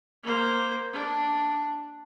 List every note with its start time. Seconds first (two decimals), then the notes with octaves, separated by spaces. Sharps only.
0.24 A#3 C5
0.93 D4